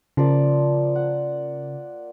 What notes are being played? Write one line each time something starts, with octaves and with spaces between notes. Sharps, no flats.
C#3 F3 A#3 D5
F#5